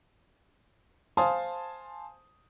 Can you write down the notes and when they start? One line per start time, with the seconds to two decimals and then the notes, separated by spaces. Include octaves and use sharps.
1.17 C5 F5 G#5 A5 C6 D#6